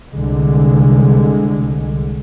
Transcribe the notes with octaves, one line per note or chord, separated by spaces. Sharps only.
C2 D3 G#3